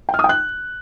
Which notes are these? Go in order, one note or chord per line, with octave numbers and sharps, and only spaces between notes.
G5
F6
D#6
G5
F#6